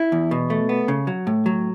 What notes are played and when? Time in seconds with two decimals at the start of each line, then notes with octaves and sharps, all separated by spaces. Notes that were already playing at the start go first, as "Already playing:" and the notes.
Already playing: E4
0.12 E2
0.31 B2
0.50 A3
0.69 B3
0.88 C#3
1.07 F#3
1.27 A2
1.46 F#3